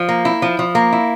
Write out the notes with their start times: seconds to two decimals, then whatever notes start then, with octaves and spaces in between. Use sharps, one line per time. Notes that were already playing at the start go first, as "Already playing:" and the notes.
Already playing: F3
0.09 A#3
0.25 E4
0.42 F3
0.59 F3
0.75 A#3
0.93 E4